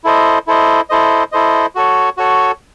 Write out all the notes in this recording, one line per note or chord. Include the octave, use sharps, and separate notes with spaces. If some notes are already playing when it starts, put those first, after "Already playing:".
E4 A4 C5 D#5
E4 A4 C5 D#5
E4 A4 C5 D#5
E4 A4 C5 D#5
F#4 A4 C#5
F#4 A4 C#5